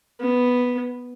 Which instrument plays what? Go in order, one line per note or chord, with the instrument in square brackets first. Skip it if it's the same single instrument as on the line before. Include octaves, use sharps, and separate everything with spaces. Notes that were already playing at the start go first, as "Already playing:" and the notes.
[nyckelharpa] B3